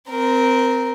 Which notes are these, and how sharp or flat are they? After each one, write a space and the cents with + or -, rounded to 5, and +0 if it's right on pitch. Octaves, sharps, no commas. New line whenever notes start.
C4 -15 A#4 +0